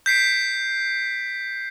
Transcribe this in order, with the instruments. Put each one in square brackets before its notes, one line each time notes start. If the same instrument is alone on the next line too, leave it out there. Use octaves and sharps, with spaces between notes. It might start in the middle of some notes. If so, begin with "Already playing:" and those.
[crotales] G6 B6 C7 D7